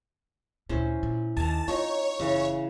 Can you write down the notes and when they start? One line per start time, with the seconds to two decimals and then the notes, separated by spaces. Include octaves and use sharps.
0.69 D2 A#2 C#4 E4 C5
1.03 A#2
1.37 D#2 A#4 G#5 A5
1.68 C4 D#4 F4 C#5
2.20 F#1 C#3 E3